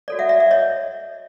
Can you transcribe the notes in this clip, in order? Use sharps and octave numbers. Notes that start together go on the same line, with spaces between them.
F#4 A4 C#5 D5
E5 F#5
D5 E5
D5 E5
C#5 D#5